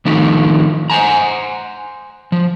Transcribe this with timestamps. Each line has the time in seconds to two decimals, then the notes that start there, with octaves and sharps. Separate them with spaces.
0.05 D#3 F3 A3 D#4 E4
0.90 C5 F#5 G#5 A#5
2.32 F3